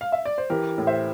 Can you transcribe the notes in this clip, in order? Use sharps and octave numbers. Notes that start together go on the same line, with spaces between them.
F5
E5
D5
C5
E3 G4 A#4
A2
C5 E5